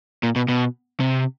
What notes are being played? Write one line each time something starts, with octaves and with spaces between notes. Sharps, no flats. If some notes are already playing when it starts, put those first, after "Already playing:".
A#2
B2
B2
C3